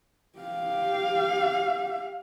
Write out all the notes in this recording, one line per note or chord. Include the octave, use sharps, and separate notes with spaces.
G4 F5